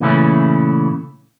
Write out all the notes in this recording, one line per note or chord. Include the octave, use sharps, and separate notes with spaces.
A#2 C#3 E3 A3 C#4 E4